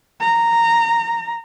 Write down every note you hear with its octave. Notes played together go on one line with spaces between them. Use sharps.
A#5